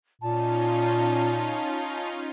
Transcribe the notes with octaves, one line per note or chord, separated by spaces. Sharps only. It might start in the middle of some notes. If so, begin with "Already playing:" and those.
A#2 C#4 D#4 F4 A5